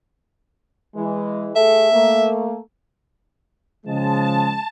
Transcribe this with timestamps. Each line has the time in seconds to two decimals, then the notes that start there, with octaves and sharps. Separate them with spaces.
0.96 E3 G#3
1.56 A3 G#4 A4 E5
1.92 A3 A#3
3.85 C#3 F3 G#3 A5